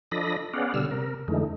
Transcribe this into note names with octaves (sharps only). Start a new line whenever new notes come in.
F3 D4 A4 D#5 B5 A#6
B3 C#4 G#4 D5 F5 F#5
B2 D3 G3 E6 F6
C3 A#4
F2 D3 E3 G#3 A3 D#4